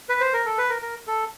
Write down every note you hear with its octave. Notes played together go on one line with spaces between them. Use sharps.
B4
C5
A#4
A4
B4
A#4
A#4
A4